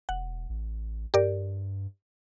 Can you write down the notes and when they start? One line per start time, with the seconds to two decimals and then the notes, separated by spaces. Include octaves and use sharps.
0.09 E1 F#5
0.49 A1
1.14 G2 G4 A#4 D5